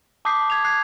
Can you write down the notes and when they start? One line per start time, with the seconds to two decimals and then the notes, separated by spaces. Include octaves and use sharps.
0.25 A5 D6 D#6 G6 B6 C7
0.50 G#6 F7
0.65 F#6 G#6 C7